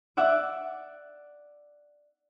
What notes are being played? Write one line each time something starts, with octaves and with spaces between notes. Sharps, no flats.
D5 E5 F#5 D6